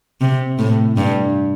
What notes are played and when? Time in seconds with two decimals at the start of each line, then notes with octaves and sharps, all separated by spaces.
0.21 C3
0.59 A2
0.97 G2